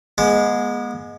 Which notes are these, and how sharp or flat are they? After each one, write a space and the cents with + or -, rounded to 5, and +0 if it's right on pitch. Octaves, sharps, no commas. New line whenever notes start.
G#3 +0 B3 -40